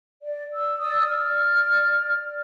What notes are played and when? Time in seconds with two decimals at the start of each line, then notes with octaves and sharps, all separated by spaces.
0.23 D5
0.55 E6
0.80 D5 D#6 E6
1.08 D5 F6